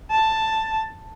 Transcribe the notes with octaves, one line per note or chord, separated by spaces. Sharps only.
A5